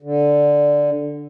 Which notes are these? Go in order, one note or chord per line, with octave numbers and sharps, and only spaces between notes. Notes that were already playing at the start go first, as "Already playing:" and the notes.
D3